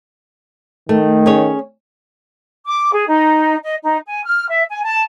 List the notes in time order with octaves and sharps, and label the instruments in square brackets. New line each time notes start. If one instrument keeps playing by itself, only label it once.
[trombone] D#3 [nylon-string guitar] A3
[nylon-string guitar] C#4 G#4 C#5
[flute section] D6
G#4
D#4
D#5
D#4
G#5
F6
E5
G#5
A5